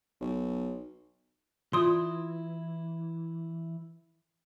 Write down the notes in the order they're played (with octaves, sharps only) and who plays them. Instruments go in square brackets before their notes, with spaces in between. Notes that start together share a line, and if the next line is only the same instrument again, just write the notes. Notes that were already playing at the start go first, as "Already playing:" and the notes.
[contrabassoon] B1
[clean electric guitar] E3 E4 [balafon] F4 [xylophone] C6 D#6